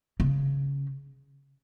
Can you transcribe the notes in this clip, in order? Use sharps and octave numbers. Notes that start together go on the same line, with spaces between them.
C#3